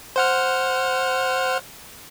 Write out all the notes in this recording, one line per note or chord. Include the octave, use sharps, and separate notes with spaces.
C5 F#5 F6